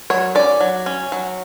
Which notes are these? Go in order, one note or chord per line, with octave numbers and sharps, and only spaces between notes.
F#3 C#5
C#4 D5
F#3
C#4
F#3